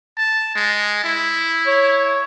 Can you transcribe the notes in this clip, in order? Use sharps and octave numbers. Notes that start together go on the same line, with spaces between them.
A5
G#3
E4
C#5